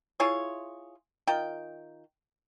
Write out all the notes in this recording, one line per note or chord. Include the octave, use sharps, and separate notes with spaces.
E4 F4 G#4 C#5
D#3 F4 G5